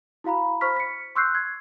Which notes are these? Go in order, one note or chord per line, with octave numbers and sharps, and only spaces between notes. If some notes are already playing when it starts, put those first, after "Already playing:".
E4 F#4 F5 A#5 B5
C5 B5 C#6 F6 B6
B6 C#7
C6 C#6 E6 F#6 G6 C7
G#6